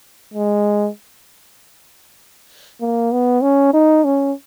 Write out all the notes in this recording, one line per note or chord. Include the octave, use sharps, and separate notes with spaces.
G#3
A#3
B3
C#4
D#4
C#4